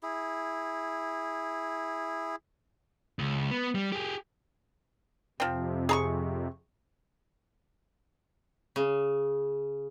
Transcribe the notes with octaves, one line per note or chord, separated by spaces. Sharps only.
E4 G#4
C#2
B3
G3
G4 G#4
F2 C3 F3 C4
G#4 A#5 C#6
C#3